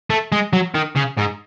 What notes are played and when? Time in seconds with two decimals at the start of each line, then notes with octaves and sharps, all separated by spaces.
0.10 A3
0.32 G#3
0.53 F#3
0.75 D#3
0.96 C#3
1.18 G#2